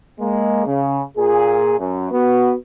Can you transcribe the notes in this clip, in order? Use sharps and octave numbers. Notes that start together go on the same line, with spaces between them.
G#3 A#3
C#3
A#2 G#4
F#2
B3 F#4